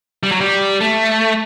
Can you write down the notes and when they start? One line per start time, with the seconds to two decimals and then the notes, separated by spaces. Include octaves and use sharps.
0.23 G3
0.32 F#3
0.41 G3
0.81 A3